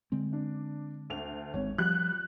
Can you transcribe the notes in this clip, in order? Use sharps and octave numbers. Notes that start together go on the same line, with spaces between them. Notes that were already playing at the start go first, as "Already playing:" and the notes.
D3 G#3 C4
D4
D2 F7
G#1 G#2 C4 C#5
F3 G3 F#6 G6